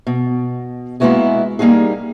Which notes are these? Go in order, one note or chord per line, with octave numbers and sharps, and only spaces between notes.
B2
G#3 A#3 B3 E4 F#4 G#4
G3 A#3 D#4 F#4 G#4